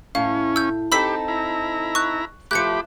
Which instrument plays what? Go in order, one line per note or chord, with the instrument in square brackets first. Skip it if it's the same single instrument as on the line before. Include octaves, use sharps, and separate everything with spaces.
[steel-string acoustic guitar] A2 [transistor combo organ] C#4 [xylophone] F5
[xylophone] E6 G6
[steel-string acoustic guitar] C4 D#4 A4 [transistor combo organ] G4 [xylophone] B5 E6 B6
[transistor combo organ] E4 A#5
[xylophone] C#6 F#6
[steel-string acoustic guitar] F3 A3 [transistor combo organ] G4 B5 D6 [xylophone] F#6 G6 C#7